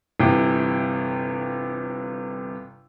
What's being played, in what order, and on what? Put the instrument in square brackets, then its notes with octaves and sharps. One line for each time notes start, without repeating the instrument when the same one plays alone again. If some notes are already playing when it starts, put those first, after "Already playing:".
[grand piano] G1 C3 E3 G5